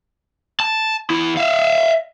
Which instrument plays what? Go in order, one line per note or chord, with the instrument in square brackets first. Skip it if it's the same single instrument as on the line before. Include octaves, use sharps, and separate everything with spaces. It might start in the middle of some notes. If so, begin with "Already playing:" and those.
[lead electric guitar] A5
E2 E4
E5 F5